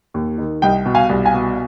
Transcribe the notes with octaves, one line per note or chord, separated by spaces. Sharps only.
D#2
D#3
C2 D#5 G5
B2
F5 G#5
C2
F5 G#5
B2